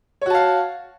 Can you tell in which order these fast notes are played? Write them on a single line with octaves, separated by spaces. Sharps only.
C#5 F#4 A5 F5